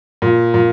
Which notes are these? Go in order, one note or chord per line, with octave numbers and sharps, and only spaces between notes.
A#2
A#2